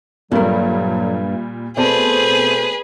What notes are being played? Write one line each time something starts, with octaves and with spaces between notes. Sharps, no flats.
G2 A#2 D3 F#3 G3 A#4
B2 A3 C4 G#4 B4 C5 D5 A5